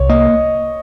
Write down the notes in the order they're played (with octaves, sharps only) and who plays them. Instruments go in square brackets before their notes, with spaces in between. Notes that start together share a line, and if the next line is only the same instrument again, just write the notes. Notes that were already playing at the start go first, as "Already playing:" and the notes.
Already playing: [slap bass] C2 [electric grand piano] C#5
[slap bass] A#3 [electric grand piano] D#5